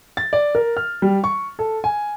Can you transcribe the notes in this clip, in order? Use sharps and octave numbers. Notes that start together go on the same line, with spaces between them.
A6
D5
A#4
F6
G3
C#6
A4
G#5